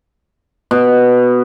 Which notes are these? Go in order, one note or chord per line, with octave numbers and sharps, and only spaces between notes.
B2